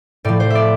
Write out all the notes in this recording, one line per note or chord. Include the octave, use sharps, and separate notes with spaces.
A2 F3 D5
C5
D5 E5